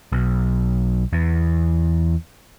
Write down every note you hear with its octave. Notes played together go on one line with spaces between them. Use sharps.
B1
E2